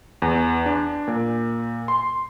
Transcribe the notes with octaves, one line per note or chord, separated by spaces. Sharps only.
E2
D4
A#2
C6